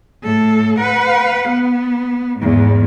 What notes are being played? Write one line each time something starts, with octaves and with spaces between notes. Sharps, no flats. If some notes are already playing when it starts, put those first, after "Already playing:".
A2 A4
B4 F#5
B3
E2 G#2